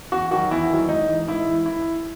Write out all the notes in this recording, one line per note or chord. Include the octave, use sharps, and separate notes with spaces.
E2 F#4
D#3 F#3 F#4
E2 E4
D#3 F#3
G#2 D#4
E3
G#2 E4
E3
E4